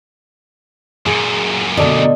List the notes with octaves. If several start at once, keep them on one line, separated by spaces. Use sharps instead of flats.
F#2 A#2 G#4
B2 D3 A3 D5 D#5